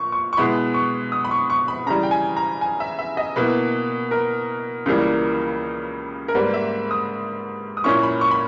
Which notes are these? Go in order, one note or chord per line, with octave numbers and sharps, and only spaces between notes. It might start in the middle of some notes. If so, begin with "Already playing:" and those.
Already playing: A#2 C#6
C#6
C#6
B2 G#3 B3 E4 B5
C#6
D#6
B5
C#6
C#6
B5
C#3 E3 G3 A#5
G5
G#5
A#5
G#5
E5
E5
D#5
B2 A#3 E4 B4
A#4
C#2 C#3 E3 G3 A#3
A#4
G#2 G3 A#3 B4
E5
D#6
D#6
A#2 A#3 C#4 E4 C#6
B5
C#6
B5